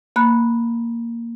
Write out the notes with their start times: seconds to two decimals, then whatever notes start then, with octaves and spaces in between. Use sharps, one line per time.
0.16 A#3 B5 F#6